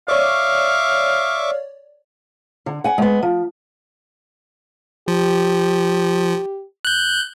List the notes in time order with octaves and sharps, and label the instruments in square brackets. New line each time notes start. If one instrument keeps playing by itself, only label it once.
[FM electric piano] C#5 D5 [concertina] E5 C#6 D6 [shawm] F5
[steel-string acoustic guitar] D3
F#5 G#5
G#3 B3
F3
[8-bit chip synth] F3 [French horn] G4
[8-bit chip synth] F#6 G6